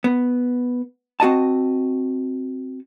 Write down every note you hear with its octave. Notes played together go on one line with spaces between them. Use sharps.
B3
C4 F#4 D#5 A5